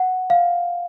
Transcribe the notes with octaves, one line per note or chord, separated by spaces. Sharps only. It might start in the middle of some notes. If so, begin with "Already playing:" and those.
Already playing: F#5
F5